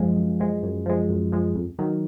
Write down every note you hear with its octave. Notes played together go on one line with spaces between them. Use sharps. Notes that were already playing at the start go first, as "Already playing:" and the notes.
Already playing: F#2 F3 G#3
F#2
F3 G#3
F#2
F3 G#3
F#2
F3 G#3
F2
D#3 F#3